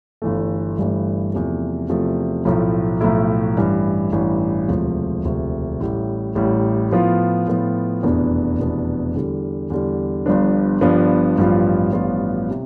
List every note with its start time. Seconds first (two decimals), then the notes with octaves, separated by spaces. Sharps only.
0.22 G1 G2 E3 A3
0.78 G1 G2 E3 A3
1.33 E2 C3 F3 A3
1.89 E2 C3 F3 A3
2.45 B1 A2 F3 A3 E4
3.01 B1 A2 F3 A3 E4
3.56 A1 G2 E3
4.12 A1 G2 E3
4.68 E1 D2 C3 F3
5.24 E1 D2 C3 F3
5.80 A1 A2 G3
6.35 A1 A2 G3
6.91 A2 F3 B3 F4
7.47 A2 F3 B3 F4
8.03 F1 E2 B2 B3 D4
8.59 F1 E2 B2 B3 D4
9.14 E2 D3 G3
9.70 E2 D3 G3
10.26 G1 G2 F3 B3 D4
10.81 G1 G2 F3 B3 D4
11.38 A1 G2 F3 B3 F4
11.93 A1 G2 F3 B3 F4
12.51 C3